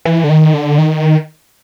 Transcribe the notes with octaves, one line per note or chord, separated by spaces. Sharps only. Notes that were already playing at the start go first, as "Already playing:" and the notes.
E3
D3
D#3
D3
D#3